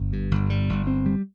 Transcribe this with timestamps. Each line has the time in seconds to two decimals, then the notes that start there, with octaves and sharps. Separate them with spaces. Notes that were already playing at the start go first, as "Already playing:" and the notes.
Already playing: G1
0.13 G2
0.31 G1
0.50 G3
0.69 G1
0.87 C4
1.06 G3